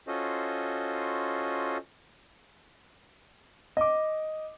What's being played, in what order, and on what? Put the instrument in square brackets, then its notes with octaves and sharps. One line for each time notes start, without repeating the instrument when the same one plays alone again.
[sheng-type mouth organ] C#4 F4 F#4 A4 C5 D#5
[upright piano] D#5 D6